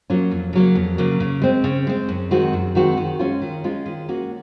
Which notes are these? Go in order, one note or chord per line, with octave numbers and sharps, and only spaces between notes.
F#3 A#3 C#4 F4
F2
C#3 F#3 A#3
F2
C#3 F#3 A#3
C#3
G#3 C4
C#3
G#3 C4
F#2
D#3 G#3 C4 F#4
F#2
D#3 G#3 C4 F#4
D#3
G#3 C#4 F4
D#3
G#3 C#4 F4
D#3
A#3 C#4 F#4